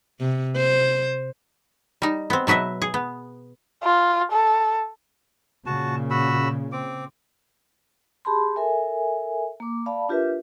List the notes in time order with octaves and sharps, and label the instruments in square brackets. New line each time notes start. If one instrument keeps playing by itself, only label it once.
[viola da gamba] C3
C5
[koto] G3 D#4
B3 C4
B2 F#3 B4 D#5 E5
G#4
B3
[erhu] F4
A4
[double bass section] A#2 C#3 [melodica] F#4 A5
[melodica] F#4 B5 E6
C4 D6
[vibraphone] G4 G#4 A5 B5 C6
A4 A#4 E5 G#5
A#3 D6
D5 F5 A5 B5
D4 F4 G4 A#4 B4 E5